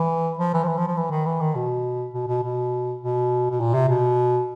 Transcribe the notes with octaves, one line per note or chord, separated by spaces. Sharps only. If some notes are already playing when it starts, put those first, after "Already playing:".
Already playing: E3
F3
E3
F3
E3
F3
F3
E3
D#3
E3
D#3
B2
B2
B2
B2
B2
B2
A#2
C3
B2